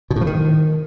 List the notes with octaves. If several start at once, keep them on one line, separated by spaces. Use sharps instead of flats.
B2
A2
F3
D#3